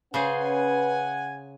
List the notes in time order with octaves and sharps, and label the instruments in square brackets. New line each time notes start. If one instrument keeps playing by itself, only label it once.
[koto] C#3 G#4 C5 [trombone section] C#4 B4 [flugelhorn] F#5 [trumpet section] G#5